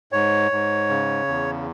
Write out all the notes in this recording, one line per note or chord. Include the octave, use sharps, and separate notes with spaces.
G#2 C#5
G#2
C#3
E2